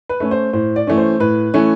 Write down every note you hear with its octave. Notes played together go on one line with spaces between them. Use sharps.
B4
A3 C#4
C5
A2 C5
D5
E3 A3 C#4
C5
A2 B4
E3 A3 C#4